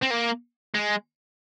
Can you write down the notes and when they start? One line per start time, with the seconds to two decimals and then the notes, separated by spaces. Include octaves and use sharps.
0.03 C4
0.11 A#3
0.74 G#3